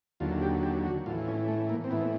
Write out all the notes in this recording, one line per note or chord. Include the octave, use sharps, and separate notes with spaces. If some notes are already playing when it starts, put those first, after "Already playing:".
D#2 D3 F#3 F4
G4
G4
F#4
A2 E3 F4
C#4
A3
A#3
C4
A2 E3 B3